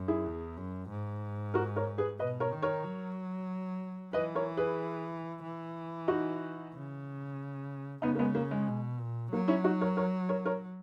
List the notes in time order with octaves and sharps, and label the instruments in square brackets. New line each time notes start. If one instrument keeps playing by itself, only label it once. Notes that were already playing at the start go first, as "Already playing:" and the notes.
Already playing: [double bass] F#2
[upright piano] E4 G#4
[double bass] E2
F#2
G#2
[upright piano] F#4 A#4
A#4 C#5
G#4 B4
[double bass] B2 [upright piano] B4 D#5
[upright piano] A#4 C#5
[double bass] D#3
[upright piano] A#4 C#5
[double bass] F#3
[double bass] E3 [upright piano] B4 D#5
[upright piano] A#4 C#5
G#4 B4
[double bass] E3
[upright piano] D#4 F#4
[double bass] C#3
[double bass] C#3 [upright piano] B3 D#4
[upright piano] A#3
G#3 B3
A#3
G#3
[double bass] B2
A#2
[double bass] F#3 [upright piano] A#3
[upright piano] C#4 E4
D#4 F#4
A#4 C#5
A#4 C#5
A#4 C#5
A#4 C#5